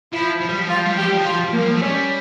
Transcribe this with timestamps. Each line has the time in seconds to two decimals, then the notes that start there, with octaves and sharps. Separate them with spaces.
0.12 F3 E4
0.41 F3
0.49 G3
0.59 F3
0.67 G3 F4
0.76 F3
0.86 G3
0.95 F3 G4
1.03 G3
1.13 F3
1.22 G3 F4
1.30 F3
1.40 G3
1.49 F3 A#3
1.58 G3
1.67 F3
1.76 A3
1.81 G3 C#4